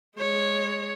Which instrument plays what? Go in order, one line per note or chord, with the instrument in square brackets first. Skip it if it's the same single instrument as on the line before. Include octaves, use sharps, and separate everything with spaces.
[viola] G#3 C#5